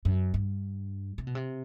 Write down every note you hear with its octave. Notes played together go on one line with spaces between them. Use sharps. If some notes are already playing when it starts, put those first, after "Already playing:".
F#2
G2
C3
B2
C3